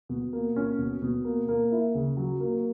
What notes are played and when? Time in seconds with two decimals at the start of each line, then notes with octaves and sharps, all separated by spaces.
0.09 B2
0.33 A#3
0.56 C#4
0.79 B2
1.02 B2
1.25 A#3
1.48 A#3
1.71 E4
1.95 C#3
2.17 F#3
2.40 A#3